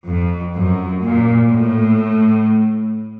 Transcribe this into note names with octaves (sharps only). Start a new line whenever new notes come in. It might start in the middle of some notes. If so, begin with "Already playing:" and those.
F2
F#2
A#2
A2